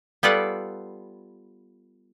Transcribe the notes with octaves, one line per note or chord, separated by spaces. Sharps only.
G3 B3 F4 A4 D5 F#5